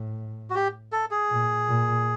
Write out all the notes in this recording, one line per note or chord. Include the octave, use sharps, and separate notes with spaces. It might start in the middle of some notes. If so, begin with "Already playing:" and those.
Already playing: A2
F#4
G4
A4
G#4
A#2
A#2